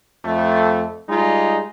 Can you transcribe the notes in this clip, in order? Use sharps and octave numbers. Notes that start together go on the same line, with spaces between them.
F2 A3
G3 G#3 D#4 F4